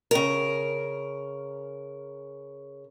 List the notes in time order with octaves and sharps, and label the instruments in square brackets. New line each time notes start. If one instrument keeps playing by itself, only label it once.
[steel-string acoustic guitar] C#3 A#4